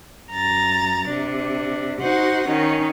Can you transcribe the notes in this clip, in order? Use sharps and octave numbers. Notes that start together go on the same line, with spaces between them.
F#2 A#5 A6
C3 D4
D#4 F#4 C5 F#5
D#3 C#4 D#4